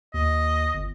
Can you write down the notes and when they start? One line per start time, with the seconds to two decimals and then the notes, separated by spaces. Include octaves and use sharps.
0.14 D#2 D#5
0.74 G1